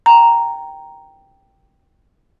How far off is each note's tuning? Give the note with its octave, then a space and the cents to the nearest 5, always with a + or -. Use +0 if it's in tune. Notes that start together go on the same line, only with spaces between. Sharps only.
G5 +0 A#5 +0